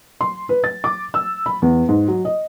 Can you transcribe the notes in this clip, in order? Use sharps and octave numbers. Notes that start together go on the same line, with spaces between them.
C6
B4
A6
D6
E6
B5
E2
G#2
F#3
D#5